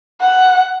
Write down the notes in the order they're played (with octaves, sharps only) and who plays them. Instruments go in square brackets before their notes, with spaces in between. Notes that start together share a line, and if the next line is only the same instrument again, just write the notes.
[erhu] F#5